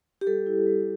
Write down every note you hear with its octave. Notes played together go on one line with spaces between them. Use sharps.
G4
G3 A4
E4
G3